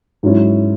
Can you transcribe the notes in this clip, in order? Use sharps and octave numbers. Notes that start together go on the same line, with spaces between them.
G#2 F#3 C#4 E4